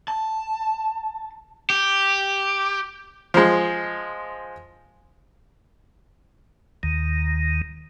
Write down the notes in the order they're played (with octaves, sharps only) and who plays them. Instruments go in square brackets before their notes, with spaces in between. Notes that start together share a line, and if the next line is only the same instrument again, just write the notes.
[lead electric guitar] A5
[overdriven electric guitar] G4
[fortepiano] F3 G#3
[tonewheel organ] D#2 D#3